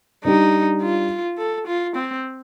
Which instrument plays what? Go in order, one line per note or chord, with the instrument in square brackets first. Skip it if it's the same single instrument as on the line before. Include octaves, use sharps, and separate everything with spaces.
[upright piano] G3 D4 G4 [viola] D#4
[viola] F4
A4
F4
C4